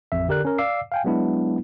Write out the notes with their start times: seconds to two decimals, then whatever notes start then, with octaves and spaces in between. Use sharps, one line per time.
0.12 A1 F2 E5
0.28 D3 G4 A#4 D5 F#6
0.45 C#4 A#4
0.58 D5 F5 D6 E6 C7
0.92 F5 G5 G#5
1.04 F#3 G#3 B3 D4 E4